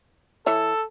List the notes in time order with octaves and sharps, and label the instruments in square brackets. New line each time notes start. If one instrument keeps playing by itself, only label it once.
[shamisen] E3 C#5 E5 [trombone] A4